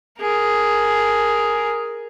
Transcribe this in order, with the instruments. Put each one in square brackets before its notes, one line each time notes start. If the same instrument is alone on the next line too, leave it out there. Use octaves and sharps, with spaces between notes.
[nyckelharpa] G#4 A#4